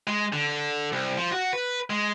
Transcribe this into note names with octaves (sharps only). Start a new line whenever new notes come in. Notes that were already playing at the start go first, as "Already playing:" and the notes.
G#3
D3
C2
F3
F#4
B4
G#3